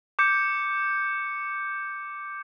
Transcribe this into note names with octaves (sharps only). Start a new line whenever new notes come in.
D6 G6 C#7